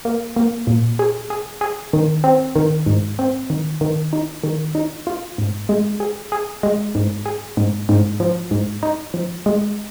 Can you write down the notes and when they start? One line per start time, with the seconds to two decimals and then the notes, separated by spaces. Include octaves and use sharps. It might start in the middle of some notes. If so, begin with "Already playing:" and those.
0.05 A#3
0.36 A#3
0.67 A#2
0.99 G#4
1.30 G#4
1.61 G#4
1.93 D#3
2.24 C4
2.56 D#3
2.86 G#2
3.19 C4
3.50 D#3
3.81 D#3
4.13 D#4
4.44 D#3
4.75 D#4
5.07 F4
5.38 G#2
5.69 G#3
6.00 G#4
6.32 G#4
6.63 G#3
6.95 G#2
7.26 G#4
7.57 G#2
7.89 G#2
8.20 F3
8.51 G#2
8.83 D#4
9.14 F3
9.46 G#3